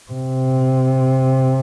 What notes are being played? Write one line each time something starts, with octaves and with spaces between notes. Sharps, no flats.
C3